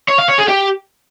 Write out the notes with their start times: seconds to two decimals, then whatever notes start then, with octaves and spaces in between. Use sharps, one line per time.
0.08 C#5
0.18 F5
0.29 C#5
0.39 G#4
0.49 G4